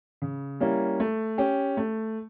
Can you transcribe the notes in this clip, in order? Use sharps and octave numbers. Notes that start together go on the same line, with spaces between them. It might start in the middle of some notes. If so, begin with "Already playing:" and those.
C#3
G3 A#3 C#4 E4
A3
C#4 G4
A3